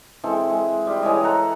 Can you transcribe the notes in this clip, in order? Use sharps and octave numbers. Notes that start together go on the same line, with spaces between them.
E3 G#3 C4 A4
G#3
G3 C5
E3 G#3 C#5 D#5
A4 C5 F#5 A#5